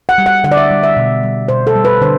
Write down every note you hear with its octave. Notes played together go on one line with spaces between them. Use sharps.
F#5
G3
F#5
D3 F#5
D5
E5
G3
E5
B2
G3
B2 C5
A4
G3
B4
D3 C5